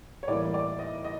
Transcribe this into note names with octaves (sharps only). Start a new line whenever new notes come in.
C#5
A2 E3 G3 A#3 D5
D5
D#5
D#5